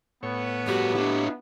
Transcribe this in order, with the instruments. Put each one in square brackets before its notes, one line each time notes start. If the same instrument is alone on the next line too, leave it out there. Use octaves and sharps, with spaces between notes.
[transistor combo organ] A2 C#5 [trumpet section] B3
[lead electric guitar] G2 F#4 [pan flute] G4
[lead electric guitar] D4 E4